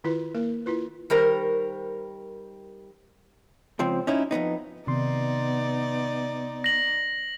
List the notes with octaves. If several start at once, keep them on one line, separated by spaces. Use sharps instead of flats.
D#3 E4 F4 B4
A#3 A#4
E4 F4 B4
D#3 G3 A#4 C5
C#2 F3 C4
C#4 D#4 E4
F2 G#2 B3 D#4
C3 D#3 B3 D#4 D5 C6
A#6 F#7